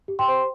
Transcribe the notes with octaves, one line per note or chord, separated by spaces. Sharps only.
G4
G5 C6
C5